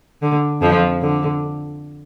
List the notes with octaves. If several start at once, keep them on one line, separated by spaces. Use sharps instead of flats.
D3
F2 F3
D3